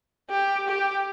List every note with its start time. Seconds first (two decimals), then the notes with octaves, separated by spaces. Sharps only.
0.30 G4
0.68 G4